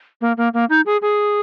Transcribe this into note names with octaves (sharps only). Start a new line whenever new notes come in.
A#3
A#3
A#3
D#4
G#4
G#4